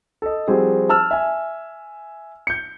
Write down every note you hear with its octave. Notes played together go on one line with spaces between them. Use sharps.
A4 D#5
F3 G3 C4 F#4 G#4 C5
A5 E6 F6
E5 G#5
G6 C#7